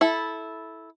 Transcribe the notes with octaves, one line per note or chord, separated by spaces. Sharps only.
E4 A4